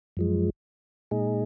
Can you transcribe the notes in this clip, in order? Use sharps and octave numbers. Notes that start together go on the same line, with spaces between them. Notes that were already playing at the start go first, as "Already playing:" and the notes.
F#2 F3 G#3
A#2 G#3 D#4 G#4